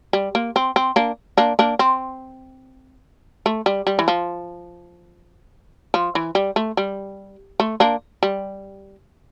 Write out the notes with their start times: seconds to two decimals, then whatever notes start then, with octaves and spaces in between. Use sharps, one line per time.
0.13 G3
0.35 A#3
0.56 C4
0.76 C4
0.96 A#3 D4
1.38 A#3 D4
1.59 A#3 D4
1.79 C4
3.46 A3
3.66 G3
3.87 G3
3.99 E3
4.08 F3
5.94 F3
6.15 E3
6.35 G3
6.56 A3
6.77 G3
7.60 A3
7.80 A#3 D4
8.23 G3